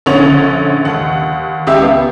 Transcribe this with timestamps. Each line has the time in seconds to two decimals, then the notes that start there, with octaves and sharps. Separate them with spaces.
0.06 A#1 D3 C#4 C#5 F7
0.85 D#2 F#5
1.67 C#2 G4 E5
1.82 B3